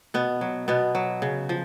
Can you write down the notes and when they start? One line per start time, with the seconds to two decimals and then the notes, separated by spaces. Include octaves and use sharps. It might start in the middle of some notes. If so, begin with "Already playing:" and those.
0.14 B2 B3
0.41 F#3
0.68 B2 B3
0.95 F#3
1.22 C#3
1.49 F3